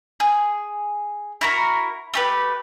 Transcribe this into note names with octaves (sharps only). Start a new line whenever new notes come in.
G#4
E4 F#4 A#4
A3 G4 B4